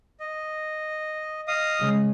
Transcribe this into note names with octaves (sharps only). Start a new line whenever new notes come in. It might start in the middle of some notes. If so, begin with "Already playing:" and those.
D#5
D#5 F5 D#6
C#3 G#3